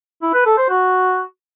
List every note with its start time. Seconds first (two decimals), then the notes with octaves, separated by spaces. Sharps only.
0.22 E4
0.34 B4
0.46 A4
0.58 C5
0.70 F#4